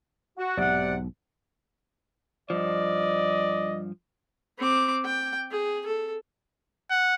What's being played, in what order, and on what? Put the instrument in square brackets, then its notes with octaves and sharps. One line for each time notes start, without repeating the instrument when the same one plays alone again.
[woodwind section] F#4
[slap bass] B1 G#2 [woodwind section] C3 D5 F#5
[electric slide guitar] G2 F3 [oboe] D5 [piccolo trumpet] D#5
[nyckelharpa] C4 D6
G5
G#4
A4
[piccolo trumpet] F#5